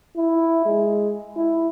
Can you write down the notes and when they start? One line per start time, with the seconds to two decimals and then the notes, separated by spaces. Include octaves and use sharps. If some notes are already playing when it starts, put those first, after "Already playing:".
0.17 E4
0.66 G#3
1.37 E4